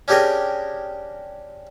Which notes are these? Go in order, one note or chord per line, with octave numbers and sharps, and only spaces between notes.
C#4 D4 G4 G#4 A#4 D#5